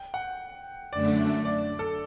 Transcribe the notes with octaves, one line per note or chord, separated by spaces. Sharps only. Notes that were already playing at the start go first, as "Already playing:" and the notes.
Already playing: G5
F#5
F#2 D3 A3 D4 D5
D5
A4